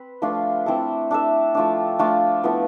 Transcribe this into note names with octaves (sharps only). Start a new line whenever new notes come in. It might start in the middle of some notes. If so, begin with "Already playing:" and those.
Already playing: C4 B4
F3 A3 D4 F4
C4 E4 A4
D4 A4 E5
F3 A3 D4
F3 A3 D4 F4
F3 B3 E4 A4